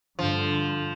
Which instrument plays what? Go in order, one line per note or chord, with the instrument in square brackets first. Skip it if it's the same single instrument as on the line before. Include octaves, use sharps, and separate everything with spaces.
[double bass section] G2 D3 [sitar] F3